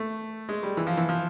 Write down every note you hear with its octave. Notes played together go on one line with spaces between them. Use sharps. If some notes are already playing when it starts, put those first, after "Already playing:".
Already playing: A3
G#3
G3
E3
F3
E3
F3